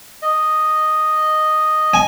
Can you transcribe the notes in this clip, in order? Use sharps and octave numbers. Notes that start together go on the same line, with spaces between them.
D#5
G#5